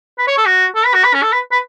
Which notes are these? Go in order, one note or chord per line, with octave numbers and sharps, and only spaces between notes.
B4
C#5
A4
F#4
A4
B4
F#4
B4
C#4
A4
B4
B4